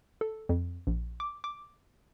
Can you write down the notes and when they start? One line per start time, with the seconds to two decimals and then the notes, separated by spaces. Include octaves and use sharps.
0.21 A4
0.49 F2
0.87 A#1
1.20 D6
1.44 D6